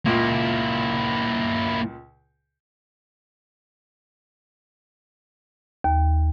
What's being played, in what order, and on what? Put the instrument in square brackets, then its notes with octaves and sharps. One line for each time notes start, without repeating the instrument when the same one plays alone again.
[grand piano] C#2 A#2 [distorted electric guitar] A#3 E4
[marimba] D#2